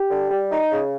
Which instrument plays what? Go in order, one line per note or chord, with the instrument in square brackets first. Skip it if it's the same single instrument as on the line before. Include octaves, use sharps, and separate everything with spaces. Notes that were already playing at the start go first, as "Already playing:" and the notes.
Already playing: [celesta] G4 G5
[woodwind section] D3
G3
D#4
C#3